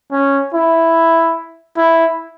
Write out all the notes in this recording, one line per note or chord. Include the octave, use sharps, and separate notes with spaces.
C#4
E4
E4